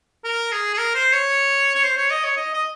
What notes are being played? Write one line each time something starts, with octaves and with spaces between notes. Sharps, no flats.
A#4
G#4
G#4
A#4
C5
C#5
C#5
C5
C#5
D#5
C#5
D#5
D#5